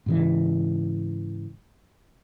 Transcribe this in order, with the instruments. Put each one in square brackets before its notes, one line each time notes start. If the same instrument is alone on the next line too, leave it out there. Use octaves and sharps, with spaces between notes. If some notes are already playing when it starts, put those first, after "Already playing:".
[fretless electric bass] G#2 C#3 E3